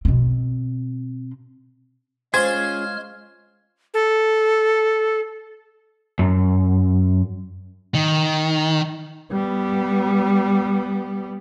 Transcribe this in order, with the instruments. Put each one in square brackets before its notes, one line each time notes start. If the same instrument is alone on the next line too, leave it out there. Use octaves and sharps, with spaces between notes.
[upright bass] B2 C4
[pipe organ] G#3 F6 [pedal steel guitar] C#4 F4 G#4 [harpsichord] C5 C6 [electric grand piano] G#6
[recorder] A4
[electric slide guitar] F#2
[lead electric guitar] D#3
[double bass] G3 B3